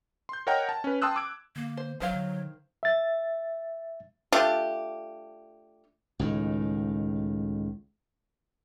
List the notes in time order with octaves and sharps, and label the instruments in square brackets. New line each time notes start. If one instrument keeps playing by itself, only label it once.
[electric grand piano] C6 G6
A#4 C#5 D#5 F#5 G5 A#5
A5
C#4 B4
G5 A5 C6 D#6 E6 F#6
D6 E6 G#6 D7
[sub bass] D3 [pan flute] A#3
[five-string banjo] C5
[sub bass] F#1 [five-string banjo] D#3 C5 F5 [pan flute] F#3
[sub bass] D3
[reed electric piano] E5 A6
[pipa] A3 D4 F4 G4
[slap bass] C#2 A2 D#3